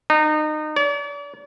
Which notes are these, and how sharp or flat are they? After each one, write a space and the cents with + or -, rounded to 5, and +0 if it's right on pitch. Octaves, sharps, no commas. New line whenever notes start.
D#4 -25
D5 -40